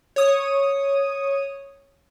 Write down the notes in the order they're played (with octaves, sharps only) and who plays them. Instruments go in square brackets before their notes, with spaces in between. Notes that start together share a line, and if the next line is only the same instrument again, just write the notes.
[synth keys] C#5 D#6